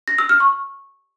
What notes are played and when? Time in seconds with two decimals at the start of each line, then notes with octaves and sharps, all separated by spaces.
0.08 A#6
0.18 E6
0.29 F6
0.40 C#6